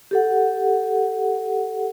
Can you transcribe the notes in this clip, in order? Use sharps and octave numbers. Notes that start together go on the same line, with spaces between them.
G4 A4 F#5